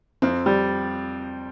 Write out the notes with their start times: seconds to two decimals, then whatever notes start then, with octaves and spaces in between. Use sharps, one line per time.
0.22 F2 C4
0.46 G3